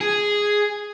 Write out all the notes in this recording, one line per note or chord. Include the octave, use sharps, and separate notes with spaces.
G#4